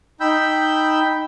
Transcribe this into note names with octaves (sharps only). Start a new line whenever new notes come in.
D#4 G5 B5 E6 G6